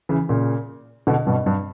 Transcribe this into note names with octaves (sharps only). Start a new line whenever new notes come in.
C#3 E3
A#2 C#3
B2 D3
G2 B2
G2